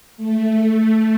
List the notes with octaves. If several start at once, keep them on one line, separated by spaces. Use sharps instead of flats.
A3